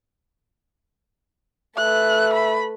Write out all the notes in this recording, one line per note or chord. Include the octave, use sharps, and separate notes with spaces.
A3 B4 E5 F#6
B5